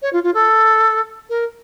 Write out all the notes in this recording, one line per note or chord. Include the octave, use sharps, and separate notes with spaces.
C#5
F4
F4
A4
A#4